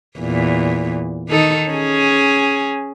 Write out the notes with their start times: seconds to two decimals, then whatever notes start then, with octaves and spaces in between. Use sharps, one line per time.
0.19 E2 A#2
1.29 D#3 D#4 A4
1.70 C#4 G#4